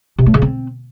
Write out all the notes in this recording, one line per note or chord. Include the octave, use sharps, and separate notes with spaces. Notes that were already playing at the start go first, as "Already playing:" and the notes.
C3
A3
C#3
C4